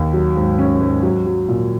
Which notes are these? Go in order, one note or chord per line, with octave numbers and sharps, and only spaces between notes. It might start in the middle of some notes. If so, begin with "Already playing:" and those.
Already playing: D#2
F#3
G#2
C#4
G#2
F#3
F#3
A#2